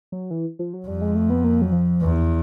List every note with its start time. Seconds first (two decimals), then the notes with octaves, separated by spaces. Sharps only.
0.12 F#3
0.31 E3
0.59 F3
0.73 F#3
0.87 F2 G3
1.02 G#3
1.15 A3
1.30 B3
1.44 A#3
1.62 F#3
1.72 F3
2.01 E2 E3